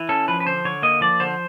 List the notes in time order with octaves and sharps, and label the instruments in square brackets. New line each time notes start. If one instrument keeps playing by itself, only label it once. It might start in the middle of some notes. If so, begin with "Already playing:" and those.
Already playing: [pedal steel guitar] E3
C#4 A4
F3 B4
B4
D3 C5
D3 C#5
A#3 D#5
F3 D5
D3 C5